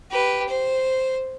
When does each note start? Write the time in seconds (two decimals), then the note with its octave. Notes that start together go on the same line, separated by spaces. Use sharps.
0.10 G4 B4
0.48 C5